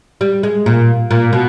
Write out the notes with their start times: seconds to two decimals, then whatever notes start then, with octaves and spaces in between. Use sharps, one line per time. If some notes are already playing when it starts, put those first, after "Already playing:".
0.21 G3
0.43 G#3
0.66 A#2
1.11 A#2
1.33 B2